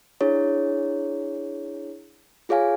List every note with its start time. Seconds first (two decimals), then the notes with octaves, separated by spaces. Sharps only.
0.21 D4 E4 G#4 C#5
2.49 F4 G#4 C#5 F5 G#5